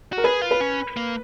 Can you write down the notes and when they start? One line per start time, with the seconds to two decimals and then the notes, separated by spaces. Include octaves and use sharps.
0.13 F#4 A#4
0.24 G#4 B4
0.42 F4
0.51 B4
0.61 C#4
0.97 A#3